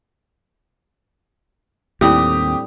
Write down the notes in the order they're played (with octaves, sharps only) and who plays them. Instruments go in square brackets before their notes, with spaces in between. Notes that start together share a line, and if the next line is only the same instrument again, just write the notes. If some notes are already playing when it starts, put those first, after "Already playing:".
[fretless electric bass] D#2 [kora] A2 G3 D4 [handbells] C4 D#6 [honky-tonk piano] G4